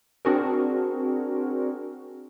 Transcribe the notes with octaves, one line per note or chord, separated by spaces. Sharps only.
C4 D4 F#4 G#4 A#4